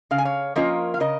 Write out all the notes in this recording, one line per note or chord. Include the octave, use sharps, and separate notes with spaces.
C#3 F5
G#5
C#5 F5
F3 A#3 C#4 F4 A#4 D#5
F5
C#3 A#4 D#5